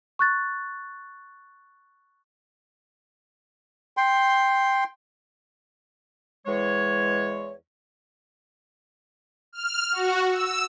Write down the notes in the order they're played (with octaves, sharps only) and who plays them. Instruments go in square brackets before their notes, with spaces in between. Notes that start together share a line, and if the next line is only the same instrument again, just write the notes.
[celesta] C#6 F#6 A6
[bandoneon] G5 C6
[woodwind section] E2 G#3 C#5
[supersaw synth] F6
F#4
E6